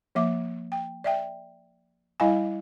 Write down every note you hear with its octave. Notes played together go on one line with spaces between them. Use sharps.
F3 A#3 E5 D6
G5
D5 E5 G5
G3 E4 D#5 F5 G#5